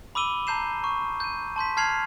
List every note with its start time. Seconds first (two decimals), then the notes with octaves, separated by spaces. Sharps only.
0.15 B5 D6 E6 D#7 G7
0.47 A5 A#5 G6 C7 E7
0.84 C#6
1.20 G6 D#7
1.56 A5 C6 G6 B6
1.77 A5 F6 G#6 C7 F7 F#7